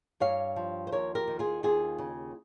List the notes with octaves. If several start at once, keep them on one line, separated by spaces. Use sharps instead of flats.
G2 C#5 F5
F3
C5
D#2 A#4 C#5
G4 A#4
D#3
F4 G#4
D#2 F4 G#4
C#3